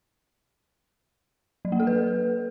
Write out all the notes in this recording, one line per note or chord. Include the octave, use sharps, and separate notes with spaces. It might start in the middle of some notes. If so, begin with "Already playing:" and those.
F#3
A#3
A4
B4